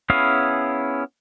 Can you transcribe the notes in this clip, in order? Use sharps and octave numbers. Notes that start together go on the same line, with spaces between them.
B3 C#4 E4 G#4 F5